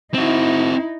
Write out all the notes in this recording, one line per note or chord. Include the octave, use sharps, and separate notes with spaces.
C4 D#4 E4 F#4